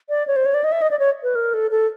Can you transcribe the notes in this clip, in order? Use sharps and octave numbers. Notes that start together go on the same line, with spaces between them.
D5
C#5
C5
C#5
D5
D#5
E5
D#5
D5
C#5
B4
A#4
A4
A4